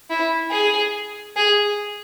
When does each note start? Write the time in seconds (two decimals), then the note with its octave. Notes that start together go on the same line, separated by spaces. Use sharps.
0.10 E4
0.52 G#4
1.37 G#4